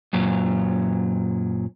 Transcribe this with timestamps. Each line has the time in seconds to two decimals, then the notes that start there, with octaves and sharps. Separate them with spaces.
0.13 F#2 A#2 F#3